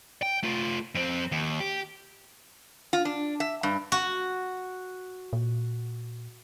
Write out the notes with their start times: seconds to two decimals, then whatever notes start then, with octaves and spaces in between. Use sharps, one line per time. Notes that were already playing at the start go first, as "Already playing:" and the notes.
0.23 G5
0.43 A3 F4
0.95 F2 C4
1.32 D#2
1.60 G4
2.93 F4
3.05 D4
3.40 E5
3.63 G2
3.92 F#4
5.33 A#2